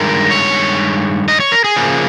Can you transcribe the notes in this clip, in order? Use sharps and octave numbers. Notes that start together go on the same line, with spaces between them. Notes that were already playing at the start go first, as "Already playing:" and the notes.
Already playing: G2 D#3 G#3 A#4
C#5
D#5
C#5
A#4
G#4
C#3 F3 A#3